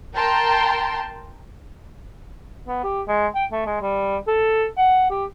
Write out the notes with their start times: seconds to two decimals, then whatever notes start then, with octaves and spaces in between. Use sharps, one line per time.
0.15 A#4 G5 A5 A#5 C6
2.68 B3
2.84 G4
3.08 G#3
3.35 G5
3.52 A3
3.66 G#3
3.81 G3
4.27 A4
4.77 F#5
5.10 G4